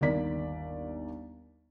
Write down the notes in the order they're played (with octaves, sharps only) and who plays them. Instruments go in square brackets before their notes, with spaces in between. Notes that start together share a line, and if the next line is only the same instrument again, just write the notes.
[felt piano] G1 D#2 A#3 D5 B6